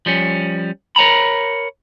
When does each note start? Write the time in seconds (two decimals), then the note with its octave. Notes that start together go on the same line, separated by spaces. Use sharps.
0.06 F3 G3 C#4
0.96 A#4 C#5 A#5 B5